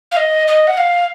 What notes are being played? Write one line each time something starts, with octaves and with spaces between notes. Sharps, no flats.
F5
D#5
D#5
F#5
F5